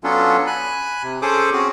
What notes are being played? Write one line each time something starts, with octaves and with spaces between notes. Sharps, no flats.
F#3 B3 C#4 D4 F4 A4
G#5 B5 F#6
C3
C#4 G#4 A4 C5 D6 D#6
C4 C#4 F#4 G#4